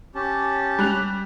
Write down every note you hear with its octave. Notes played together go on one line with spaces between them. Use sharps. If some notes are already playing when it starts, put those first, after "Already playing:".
C#4 G4 A5
G3 F#6 F7